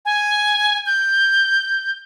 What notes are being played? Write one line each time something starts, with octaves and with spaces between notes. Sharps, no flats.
G#5
G6